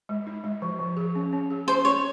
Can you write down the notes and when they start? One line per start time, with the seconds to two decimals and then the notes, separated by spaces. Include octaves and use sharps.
0.09 G#3
0.27 D#4
0.44 G#3
0.62 F3
0.79 F3
0.97 G#4
1.15 C#4
1.33 C#4
1.50 G#4
1.67 C#4 C5
1.85 C#4 C#5